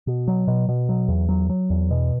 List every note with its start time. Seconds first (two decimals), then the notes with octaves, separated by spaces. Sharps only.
0.07 B2
0.28 F#3
0.48 B2
0.69 B2
0.89 F#3
1.08 E2
1.29 F#3
1.50 F#3
1.70 E2
1.91 B2